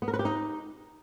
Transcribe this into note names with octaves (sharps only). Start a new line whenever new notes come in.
B3
A#4
B4
G4
D#4